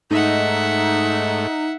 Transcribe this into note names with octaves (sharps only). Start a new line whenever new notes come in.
G#2 A3 D#4 E5 F#5